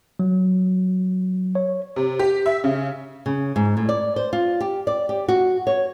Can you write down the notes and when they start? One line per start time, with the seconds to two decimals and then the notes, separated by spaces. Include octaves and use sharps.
0.19 F#3
1.55 C#5
1.96 C3
2.19 G4
2.46 E5
2.64 C#3
3.26 C#3
3.56 G#2
3.77 A2
3.89 D5
4.16 C5
4.33 F4
4.61 G4
4.87 D5
5.09 G4
5.28 F#4
5.67 C#5